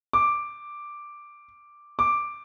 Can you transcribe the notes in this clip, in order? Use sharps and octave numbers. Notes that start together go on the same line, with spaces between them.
D6
D6